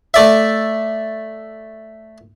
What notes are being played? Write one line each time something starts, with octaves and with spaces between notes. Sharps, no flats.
A3 D5 E5